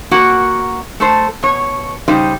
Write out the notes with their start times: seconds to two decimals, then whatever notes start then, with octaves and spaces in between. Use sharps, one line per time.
0.11 A#3 F#4 F#5
1.00 A3 A4 C5
1.43 B2 C#5
2.08 C#3 G3 D#4 G4 C5 D#5